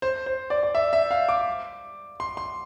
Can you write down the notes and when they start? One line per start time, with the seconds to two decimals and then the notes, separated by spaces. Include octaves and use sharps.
0.02 C5
0.26 C5
0.50 D5
0.63 D5
0.75 E5
0.93 E5
1.11 F5
1.29 D6
2.20 C6
2.37 C6